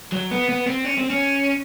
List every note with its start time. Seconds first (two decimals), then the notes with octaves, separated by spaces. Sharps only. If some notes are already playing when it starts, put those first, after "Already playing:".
0.12 F#3
0.31 B3
0.49 B3
0.67 C4
0.85 C#4
0.98 C4
1.10 C#4